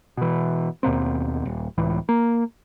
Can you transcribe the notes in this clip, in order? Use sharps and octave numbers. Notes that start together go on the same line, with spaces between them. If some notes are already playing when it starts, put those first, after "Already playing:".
B2 E3
D#2 B2 A#3 C4
D#1
C#2 A2 E3
A#3